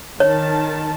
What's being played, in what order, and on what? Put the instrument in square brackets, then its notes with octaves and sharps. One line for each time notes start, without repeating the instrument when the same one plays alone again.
[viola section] D#3 A5 [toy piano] C#5